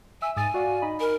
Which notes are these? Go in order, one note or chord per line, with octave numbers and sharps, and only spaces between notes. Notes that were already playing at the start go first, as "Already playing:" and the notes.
E5 G#5 E6
G#2 G#5 D#6 A6
F#4 D5 F5
D#4 D#5 B5
A#4